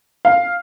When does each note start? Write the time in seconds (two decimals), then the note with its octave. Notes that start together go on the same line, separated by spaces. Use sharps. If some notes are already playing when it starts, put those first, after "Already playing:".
0.25 F5